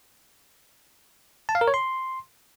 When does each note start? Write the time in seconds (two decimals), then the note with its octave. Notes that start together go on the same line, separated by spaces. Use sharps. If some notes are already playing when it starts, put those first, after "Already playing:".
1.49 A5
1.55 F5
1.61 A#4
1.68 C#5
1.74 C6